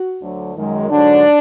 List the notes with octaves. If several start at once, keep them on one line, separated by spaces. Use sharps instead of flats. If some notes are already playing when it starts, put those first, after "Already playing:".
Already playing: F#4
D2 D3 F#3
F#2 D#3 G#3
G#2 D3 F#3 D4